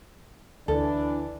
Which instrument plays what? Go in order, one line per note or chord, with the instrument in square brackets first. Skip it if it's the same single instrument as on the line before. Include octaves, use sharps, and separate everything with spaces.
[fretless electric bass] D2 [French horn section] E3 D4 [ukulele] A4